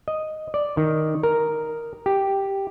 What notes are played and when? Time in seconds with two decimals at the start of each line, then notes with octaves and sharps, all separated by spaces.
0.08 D#5
0.54 D5
0.77 D#3
1.23 A#4
2.06 G4